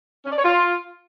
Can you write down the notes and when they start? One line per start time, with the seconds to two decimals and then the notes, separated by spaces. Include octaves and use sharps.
0.25 C#4
0.31 D5
0.37 C#5
0.43 F4